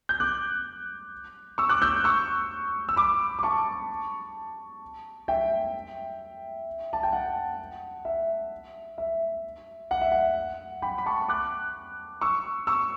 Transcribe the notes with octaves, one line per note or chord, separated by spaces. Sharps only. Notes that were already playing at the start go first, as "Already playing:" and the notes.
G6
D6 F#6
C#6 E6
D6 F#6
E6 G6
C#6 E6
E6
B5 D6
D6
A5 C#6
E5 G5
A5
G5
F#5
E5
E5
F#5
E5
F#5
G5 B5
B5
A5 C#6
D6 F#6
C#6 E6
C#6 E6